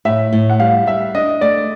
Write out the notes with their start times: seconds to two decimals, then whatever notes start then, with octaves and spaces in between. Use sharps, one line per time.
0.05 A2 E5
0.33 A2
0.50 F#5
0.60 G3 F5
0.87 G3 E5
1.14 D4 D#5
1.41 A3 D5